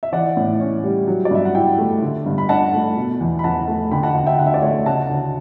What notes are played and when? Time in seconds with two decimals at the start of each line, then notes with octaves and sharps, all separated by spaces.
0.03 E5
0.12 E3 D5 F#5
0.37 A2
0.60 C#4
0.84 G3
1.07 F#3
1.25 D5
1.31 G2 E5
1.45 F#5
1.55 E4 E5 G5
1.79 A3
2.02 D3
2.26 G2
2.38 B5
2.49 D4 F#5 A5
2.73 A3
2.97 B2
3.20 E2
3.39 B5
3.44 E2 F#5 A5
3.68 A3
3.91 D3 G5 B5
4.03 F#5 A5
4.15 D2 F#5
4.26 E5 G5
4.39 D2 F#5
4.46 E5
4.54 D5
4.62 A3 C#5 E5
4.86 C#3 F#5 A5
5.09 D2